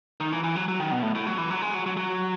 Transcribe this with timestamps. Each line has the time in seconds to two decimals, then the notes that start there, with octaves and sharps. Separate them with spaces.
0.20 D#3
0.32 E3
0.43 E3
0.56 F#3
0.68 F#3
0.80 D#3
0.92 B2
1.02 A2
1.15 A2
1.27 F#3
1.38 E3
1.50 F#3
1.62 G#3
1.74 F#3
1.86 F#3
1.97 F#3